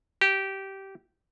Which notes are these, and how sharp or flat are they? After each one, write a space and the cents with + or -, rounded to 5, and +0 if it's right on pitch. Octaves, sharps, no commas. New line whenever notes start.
G4 -15